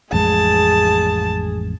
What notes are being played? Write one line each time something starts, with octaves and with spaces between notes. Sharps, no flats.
A1 F2 G#3 G#4 A5